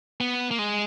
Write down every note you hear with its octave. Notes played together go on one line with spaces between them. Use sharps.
B3
A#3
G#3